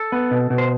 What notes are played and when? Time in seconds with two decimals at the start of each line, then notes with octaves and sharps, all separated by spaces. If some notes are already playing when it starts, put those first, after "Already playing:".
Already playing: A4
0.12 B3
0.31 B2
0.50 B2
0.58 C5